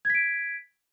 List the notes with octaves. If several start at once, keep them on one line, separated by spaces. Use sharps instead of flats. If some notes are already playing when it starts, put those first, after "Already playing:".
G#6 B6 D7